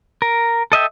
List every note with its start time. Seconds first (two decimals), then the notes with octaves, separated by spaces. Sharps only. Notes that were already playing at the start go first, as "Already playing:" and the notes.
0.22 A#4
0.72 A4 D#5 E5 G5